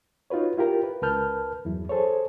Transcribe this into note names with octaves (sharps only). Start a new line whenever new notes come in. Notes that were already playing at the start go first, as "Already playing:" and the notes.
D#4 F4 F#4 B4 C#5
E4 F4 G4 A#4 G5
B4
C#2 A#4 B4 A5 F6 G6
E2 G2 F#3 E4
G#4 A4 C5 C#5